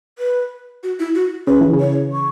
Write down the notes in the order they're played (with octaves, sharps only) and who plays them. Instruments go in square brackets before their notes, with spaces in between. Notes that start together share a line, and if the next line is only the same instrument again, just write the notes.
[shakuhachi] B4
F#4
E4
F#4
[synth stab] C#3 [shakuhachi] B4
[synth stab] E3
C#3
[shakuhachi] C#5
C#6